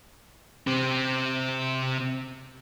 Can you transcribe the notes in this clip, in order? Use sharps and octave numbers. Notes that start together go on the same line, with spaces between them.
C3 C4